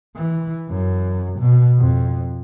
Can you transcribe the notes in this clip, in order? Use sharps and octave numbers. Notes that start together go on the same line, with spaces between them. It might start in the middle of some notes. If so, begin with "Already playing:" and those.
E3
F#2
B2
F2